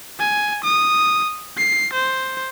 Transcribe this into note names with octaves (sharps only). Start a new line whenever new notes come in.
G#5
D#6
C7
C5